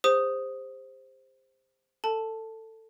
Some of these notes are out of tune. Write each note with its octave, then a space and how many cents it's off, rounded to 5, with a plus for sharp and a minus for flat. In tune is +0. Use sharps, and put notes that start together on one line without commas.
G4 +45 C5 +0 D#6 +0
A4 +20 A5 +0